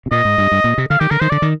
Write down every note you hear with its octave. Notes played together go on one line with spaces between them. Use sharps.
C3
A#2 D#5
G#2
G2
G2
A#2
C3
D3 F5
D#3 G4
D3 A#4
D#3 C5
D3 D5
D#3